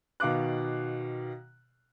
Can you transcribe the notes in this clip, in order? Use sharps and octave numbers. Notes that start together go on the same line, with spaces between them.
B2 D#3 F5 D6 F#6